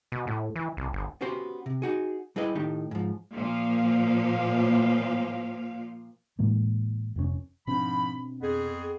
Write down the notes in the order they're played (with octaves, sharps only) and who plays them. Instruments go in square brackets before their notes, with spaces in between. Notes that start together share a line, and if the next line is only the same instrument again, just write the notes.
[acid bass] B2
A2
E3
C2
G1
[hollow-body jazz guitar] B3 C#4 F#4 G4 C5
C3
D#4 F#4 G#4
G3 E4 G#4 B4 D#5
A2 D#3 D#4 G4
G#2 F3
[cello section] A#2 F3 F5
[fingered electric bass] A2 E3 G#3 A#3
F1 G#2 C#4
[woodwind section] G#2 F3 B5 [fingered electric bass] B2 C4 D4
[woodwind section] F2 B3 G#4